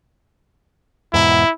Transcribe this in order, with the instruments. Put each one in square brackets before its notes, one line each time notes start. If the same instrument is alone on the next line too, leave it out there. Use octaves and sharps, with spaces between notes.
[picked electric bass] E2 G#2 B2 [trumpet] E4